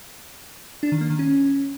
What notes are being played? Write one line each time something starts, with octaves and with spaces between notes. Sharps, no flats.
D4
D#3
A#3
D#3
C#4